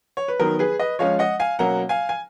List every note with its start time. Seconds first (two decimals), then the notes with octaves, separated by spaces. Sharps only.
0.17 C#5
0.28 B4
0.40 D#3 F#3 B3 A#4
0.59 G#4 B4
0.79 B4 D#5
0.99 F3 G#3 C#4 C#5 F5
1.19 D#5 F#5
1.39 F5 G#5
1.59 B2 F#3 A#3 C#4 F#5 A#5
1.89 F5 G#5
2.09 G#5